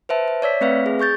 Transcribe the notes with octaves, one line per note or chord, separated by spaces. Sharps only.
B4 C5 E5 A5
E5
C#5 D5 E6 B6
A3 C4 B4 E5 F5
G#4
G#4 C#6 G6 A6